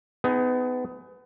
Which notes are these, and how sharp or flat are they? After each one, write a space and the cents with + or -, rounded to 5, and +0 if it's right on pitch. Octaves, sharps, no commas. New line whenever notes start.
B3 +30 D#4 +10 G#4 +0